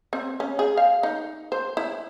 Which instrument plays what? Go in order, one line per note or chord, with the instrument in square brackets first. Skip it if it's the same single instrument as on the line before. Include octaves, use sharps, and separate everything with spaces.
[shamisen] C4
C#4
G#4
F5
D#4
C5
E4